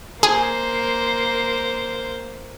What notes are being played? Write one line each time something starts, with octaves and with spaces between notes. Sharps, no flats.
A#3 G#4 C5